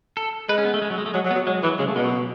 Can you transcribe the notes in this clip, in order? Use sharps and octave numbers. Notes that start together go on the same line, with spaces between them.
A4
G#3 B4
C#4
B3
A3
G#3
F#3
G#3
A3
F#3 G#3
F#3
B3
F#3
F#3 G#3
E3 F#3
C#3 G#3
A3
B2 G#3
F#3